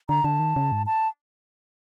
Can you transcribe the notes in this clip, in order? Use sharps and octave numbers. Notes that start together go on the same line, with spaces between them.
D3 A#5
D3 A5
D#3
C#3
G#2
A5